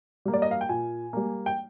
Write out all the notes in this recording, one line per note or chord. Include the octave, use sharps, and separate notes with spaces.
G3 A#3
D5
D#5
F5
G5
A#2 G#5
G3 A#3
G5